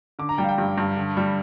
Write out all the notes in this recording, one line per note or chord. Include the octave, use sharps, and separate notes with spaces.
D3 D6
A#5
G3 G5
F5
G5
G2
G2
D3
G3